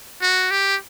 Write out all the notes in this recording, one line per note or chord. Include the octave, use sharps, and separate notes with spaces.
F#4
G4